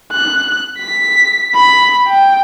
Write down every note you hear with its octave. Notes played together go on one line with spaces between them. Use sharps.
F#6
B6
B5
G5